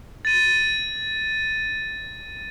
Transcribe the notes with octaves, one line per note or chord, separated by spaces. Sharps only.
A6 D#7